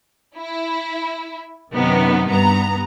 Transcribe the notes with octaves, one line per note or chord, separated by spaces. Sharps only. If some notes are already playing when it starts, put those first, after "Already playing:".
E4
F#2 C3 D#3 B3 D#4
G2 B3 A#5